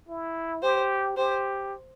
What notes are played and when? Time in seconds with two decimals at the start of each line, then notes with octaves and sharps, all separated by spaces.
0.09 E4
0.63 G4 C5
1.17 G4 C5